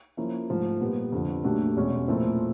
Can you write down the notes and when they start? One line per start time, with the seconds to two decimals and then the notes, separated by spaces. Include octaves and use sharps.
0.17 F3 A#3 C#4 E4
0.49 G#2 F3 A3
0.81 A#2 G3 B3
1.12 F2 D3 F3
1.44 A#2 F#3 A3 D4 G4
1.76 E2 B2 G#3 C#4
2.08 A#2 F3 A3 C4 E4